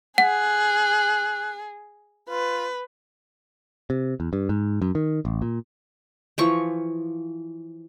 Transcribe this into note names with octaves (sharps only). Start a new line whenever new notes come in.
G#4 F#5 F#6
F4 B4
C3
E2
G2
G#2
F#2
D#3
A1
A#2
E3 F3 C#6